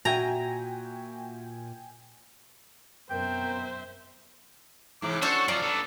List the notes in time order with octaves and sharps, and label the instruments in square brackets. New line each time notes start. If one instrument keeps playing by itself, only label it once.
[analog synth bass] A#2 [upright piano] F#4 E5 [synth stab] G5 G#5 [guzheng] A#5
[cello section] F#2 B2 [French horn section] B3 C4 A#4 [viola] C5 E5 [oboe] G5
[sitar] G#2 C3 E3 [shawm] D6
[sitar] C#4 C5 [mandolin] D4 C#5 C#6 [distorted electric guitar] F#4 [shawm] A4
[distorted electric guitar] F#2 F3 [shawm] F4 [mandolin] D5 A#5
[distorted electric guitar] B3 D4 [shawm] A4